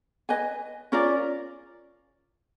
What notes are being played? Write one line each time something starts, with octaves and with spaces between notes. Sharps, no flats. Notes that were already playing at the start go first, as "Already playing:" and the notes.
B4 D#5 G#5
C#4 F4 A#4 D5